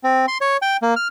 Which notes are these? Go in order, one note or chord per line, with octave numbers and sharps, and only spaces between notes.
C4
C6
C#5
G5
A#3
F6